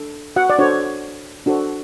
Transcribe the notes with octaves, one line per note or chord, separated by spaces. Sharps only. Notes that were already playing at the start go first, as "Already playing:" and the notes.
Already playing: D4 A4
F#4 F#5
D5
D4 F#4 A4 C5 C#5
D4 F#4 A4 C5